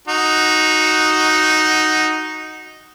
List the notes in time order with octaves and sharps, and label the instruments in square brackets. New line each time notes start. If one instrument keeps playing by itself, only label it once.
[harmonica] D#4 F#4